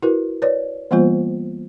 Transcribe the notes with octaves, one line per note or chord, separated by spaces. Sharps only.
E4 F#4 A#4 B4
B4 C#5 D5
E3 G3 A#3 B3 F4 C5